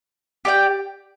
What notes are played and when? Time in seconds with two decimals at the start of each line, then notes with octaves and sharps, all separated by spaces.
0.45 G4 D5 G5